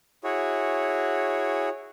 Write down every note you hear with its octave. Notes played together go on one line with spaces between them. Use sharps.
E4 F#4 G#4 C#5